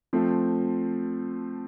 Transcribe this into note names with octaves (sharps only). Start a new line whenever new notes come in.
F3 A3 C4